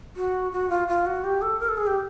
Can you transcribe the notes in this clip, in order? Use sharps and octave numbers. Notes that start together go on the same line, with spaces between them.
F#4
F#4
F4
F4
F#4
G4
A4
A#4
A4
G#4
G4